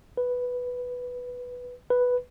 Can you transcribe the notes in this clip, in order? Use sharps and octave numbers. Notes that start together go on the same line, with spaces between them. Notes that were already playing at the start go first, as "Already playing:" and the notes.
B4
B4